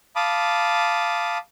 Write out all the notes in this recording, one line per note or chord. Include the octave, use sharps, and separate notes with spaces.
F5 A5 B5 D6 D#6